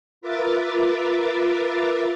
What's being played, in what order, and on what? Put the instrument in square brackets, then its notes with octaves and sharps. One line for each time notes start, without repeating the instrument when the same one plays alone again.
[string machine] F4 A#4 B4 E5 D6 A6